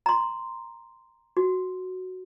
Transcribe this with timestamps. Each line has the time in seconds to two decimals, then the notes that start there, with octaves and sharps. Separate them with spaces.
0.06 A#5 C6
1.37 F#4